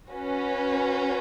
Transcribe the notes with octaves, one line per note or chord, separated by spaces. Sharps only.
C#4 F#4 B4